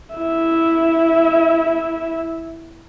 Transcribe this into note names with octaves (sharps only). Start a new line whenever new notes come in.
E4 E5